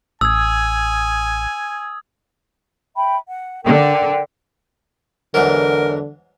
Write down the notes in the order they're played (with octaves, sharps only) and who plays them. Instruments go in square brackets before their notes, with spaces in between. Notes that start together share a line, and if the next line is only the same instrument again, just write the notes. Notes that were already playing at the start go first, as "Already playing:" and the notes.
[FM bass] A1 [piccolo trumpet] G#5 [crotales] D#6 G#6 [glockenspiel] E6
[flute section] E5 G5 B5
F#5
[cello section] D3 [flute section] A#4 G5
[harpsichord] E2 G#2 F#3 [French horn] D3 [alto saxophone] A#4